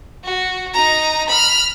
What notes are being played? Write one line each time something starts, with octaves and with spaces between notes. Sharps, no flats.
F#4
D#4 A#5
B5 F6